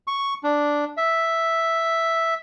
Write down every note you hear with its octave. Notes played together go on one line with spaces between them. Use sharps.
C#6
D4
E5